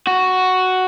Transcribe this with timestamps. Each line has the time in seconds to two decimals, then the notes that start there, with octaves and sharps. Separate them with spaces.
0.07 F#4